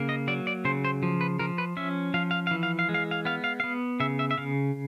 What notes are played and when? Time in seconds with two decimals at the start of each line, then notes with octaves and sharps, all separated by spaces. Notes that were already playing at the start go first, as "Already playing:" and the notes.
Already playing: C#3 A#3
0.09 D#5
0.28 F#3 D5
0.47 D5
0.65 C#3 C5
0.84 C5
1.03 F3
1.21 B4
1.39 F3 A#4
1.58 B4
1.77 C#4 E5
2.14 F3 F5
2.31 F5
2.47 F5
2.51 E3
2.63 F5
2.79 F5
2.89 G#3
2.94 F5
3.11 F5
3.25 B3 F5
3.44 F5
3.60 B3 F5
4.00 C#3 E5
4.19 E5
4.31 E5
4.38 C#3 F5